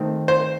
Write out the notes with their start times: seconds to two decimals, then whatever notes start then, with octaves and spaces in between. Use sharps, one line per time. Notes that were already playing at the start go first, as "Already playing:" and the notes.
Already playing: D#3 A3 C4
0.28 C5